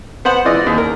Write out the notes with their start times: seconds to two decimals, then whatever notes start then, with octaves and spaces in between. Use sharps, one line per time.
0.25 B3 C5 F#5
0.45 E3 G#3 B3 F4 D5 D#5
0.66 D#2
0.78 A#4